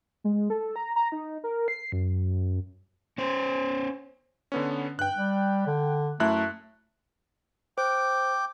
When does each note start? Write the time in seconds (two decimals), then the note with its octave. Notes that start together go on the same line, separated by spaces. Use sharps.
0.24 G#3
0.50 A4
0.76 A#5
0.96 A#5
1.12 D#4
1.44 A#4
1.68 C7
1.92 F#2
3.18 C#4 C5
4.52 D3 B3 C#4
4.99 G2 G5 F#6
5.16 G3
5.66 D3
6.20 F#2 A3 E4 F#6
7.78 C5 G5 D6